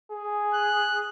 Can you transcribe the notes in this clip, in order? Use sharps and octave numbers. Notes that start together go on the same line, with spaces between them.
G#4
F#6